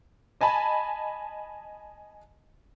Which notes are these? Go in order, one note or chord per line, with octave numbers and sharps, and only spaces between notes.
D#5 G#5 A5 B5